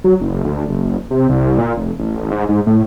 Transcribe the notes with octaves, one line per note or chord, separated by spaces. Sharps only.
F#3
F#1
D2
F#1
C3
C2
A#2
F1
A1
G#2
G#2
A2